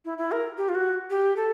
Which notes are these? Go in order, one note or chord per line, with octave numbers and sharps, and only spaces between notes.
E4
E4
A#4
G4
F4
F#4
G4
A4